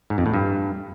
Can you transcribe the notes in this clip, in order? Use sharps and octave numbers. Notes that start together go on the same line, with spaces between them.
G#2
F2
A2
G2